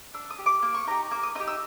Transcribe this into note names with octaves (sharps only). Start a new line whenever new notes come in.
D4 E6
D#6
G4
D6
A#3 D6
C#6
D#4 G4 A#5
A#3 D6
D#6
D#4 G4 D#6
E6